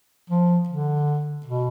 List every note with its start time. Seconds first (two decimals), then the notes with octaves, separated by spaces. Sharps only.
0.30 F3
0.68 D3
1.46 B2